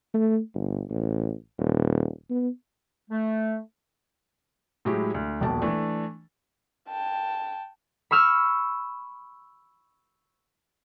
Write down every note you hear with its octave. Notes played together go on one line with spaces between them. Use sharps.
A3
G1
A1
D#1
B3
A3
A2 F#3 G#3 E4 G4
D2
D#1 A#1 B2 D5 A5
E3 A3 D4
G5 A5
B5 C#6 E6 F6